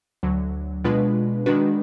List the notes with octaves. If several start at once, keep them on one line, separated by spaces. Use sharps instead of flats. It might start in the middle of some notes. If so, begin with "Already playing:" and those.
D2 D3 F#3
B2 G#3 D4 F4 B4
D#3 G#3 D4 F#4 B4